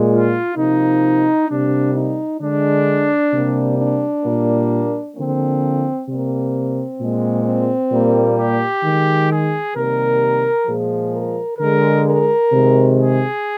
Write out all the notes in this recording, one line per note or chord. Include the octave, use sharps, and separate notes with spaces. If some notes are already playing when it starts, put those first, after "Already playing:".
Already playing: A#2 G#3
F4
C3 F3 A#3 D#4
C3 G3 A#3 D4
D#4
D3 G#3 D4
C3 G3 A#3
D4
A#2 G3 A#3
D3 F3 A#3 C4
C3 G3 A#3 C4
A#2 G#3
C4
A#2 G3 A#3
G4
D#3 G#3
G#4
C3 D#3 G3 A#3 A#4
A#2 F3 G#3 G#4
A#4
D3 G#3 A#4
A#4
C3 D#3 G#3
G#4